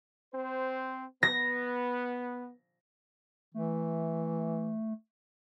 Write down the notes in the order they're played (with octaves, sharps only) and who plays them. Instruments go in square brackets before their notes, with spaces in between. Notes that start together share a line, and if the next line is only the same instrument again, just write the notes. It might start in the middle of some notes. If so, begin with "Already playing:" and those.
[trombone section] C4 C5
[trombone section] B3 [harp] A#6
[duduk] E3 [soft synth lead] A3